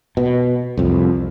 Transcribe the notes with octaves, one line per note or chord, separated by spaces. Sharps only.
B2
C2 F2